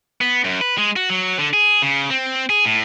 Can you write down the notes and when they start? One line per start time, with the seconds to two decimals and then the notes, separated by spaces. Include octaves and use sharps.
0.21 B3
0.44 F#2
0.61 B4
0.78 G#3
0.96 F#4
1.10 F#3
1.39 D3
1.53 G#4
1.82 C#3
2.10 C4
2.50 G#4
2.65 A2